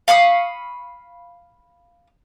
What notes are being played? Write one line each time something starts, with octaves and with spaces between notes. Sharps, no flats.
F5 B5 C#6 D#6